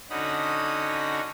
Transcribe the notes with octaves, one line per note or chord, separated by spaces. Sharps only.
D3 C#4 D#4 F#4 B5 D#6